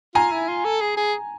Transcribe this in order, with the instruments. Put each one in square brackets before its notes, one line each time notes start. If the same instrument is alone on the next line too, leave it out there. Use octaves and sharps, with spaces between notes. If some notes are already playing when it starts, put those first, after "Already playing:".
[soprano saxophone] F4 [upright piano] G#5 A#5
[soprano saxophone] E4
F4
A4
G#4
G#4